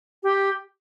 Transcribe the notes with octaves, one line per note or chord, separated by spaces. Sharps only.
G4